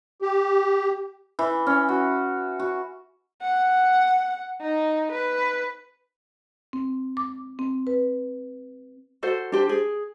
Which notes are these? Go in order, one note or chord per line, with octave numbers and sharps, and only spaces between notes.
G4
E3
C#4
F#4
F#4
F#5
D#4
B4
C4
D6
C4
B4
F#4 A4 C5
D4 G4 C5
G#4